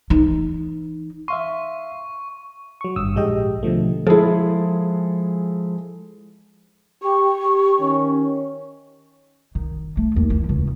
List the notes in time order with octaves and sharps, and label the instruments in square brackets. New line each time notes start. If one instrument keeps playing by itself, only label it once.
[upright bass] E3 D#4
[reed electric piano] E5 F5 C6 [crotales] C#6
[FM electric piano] F#3 C#6
G#1 G2 D#6 E6
A#1 G#2 G#3 G4 D#5 G5
B2 D3 F3 A3
[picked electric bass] F3 G#3 [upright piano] E4 G#4 A4
[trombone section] G4 [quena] C#6
[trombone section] G4
D#3 C#4
[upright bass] D#3
A3
D#2
E3
C#2